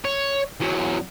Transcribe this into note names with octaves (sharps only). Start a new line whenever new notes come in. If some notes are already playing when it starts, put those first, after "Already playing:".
C#5
E2 F#3